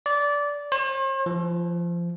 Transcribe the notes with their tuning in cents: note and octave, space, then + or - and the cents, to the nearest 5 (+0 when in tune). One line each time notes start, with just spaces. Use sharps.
D5 -20
C5 +45
F3 -20